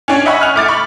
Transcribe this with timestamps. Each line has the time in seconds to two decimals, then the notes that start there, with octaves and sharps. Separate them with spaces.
0.08 C#4 D4 C#5
0.26 D#5 E5 F#5 G#5 B5 C#6
0.41 G#5 F6 F#6 F7
0.56 A3 D6 A6
0.68 B5 C#6